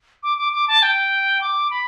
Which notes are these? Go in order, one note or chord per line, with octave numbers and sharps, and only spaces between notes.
D6
D6
D6
A5
G5
D6
B5